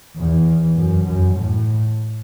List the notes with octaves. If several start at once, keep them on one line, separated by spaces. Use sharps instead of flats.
E2
F#2
F#2
A2